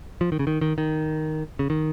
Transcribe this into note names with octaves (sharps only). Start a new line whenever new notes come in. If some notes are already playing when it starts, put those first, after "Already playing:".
F3
D#3
C#3
D#3
D#3
D#3
C#3
D#3